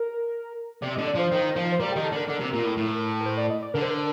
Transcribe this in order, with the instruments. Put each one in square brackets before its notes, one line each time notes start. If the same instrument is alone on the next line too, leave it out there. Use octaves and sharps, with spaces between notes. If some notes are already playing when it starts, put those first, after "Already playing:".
Already playing: [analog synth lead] A#4
[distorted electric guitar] C3 [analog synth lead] D5
[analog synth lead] D#5
[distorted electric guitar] D3
[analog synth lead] D5
[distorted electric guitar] F3 [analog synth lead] C5
[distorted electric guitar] D#3
F3
[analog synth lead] C5
[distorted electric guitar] G3 [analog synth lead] A#4
[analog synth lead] G4
[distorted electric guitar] D#3
[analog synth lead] A4
[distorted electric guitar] D3 [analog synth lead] A#4
[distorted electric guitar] D3
C3
A#2
A2
A2
[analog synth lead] A#4
C5
D5
D#5
D5
[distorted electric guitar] D3 [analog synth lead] A#4
[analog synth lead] C5
A#4